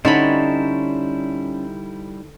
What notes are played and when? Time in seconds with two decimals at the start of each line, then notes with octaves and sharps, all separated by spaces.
0.05 D3 G3 C#4 D#4 E4 C5 C#5 B5